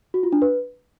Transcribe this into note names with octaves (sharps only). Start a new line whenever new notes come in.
F#4
F4
D4
B4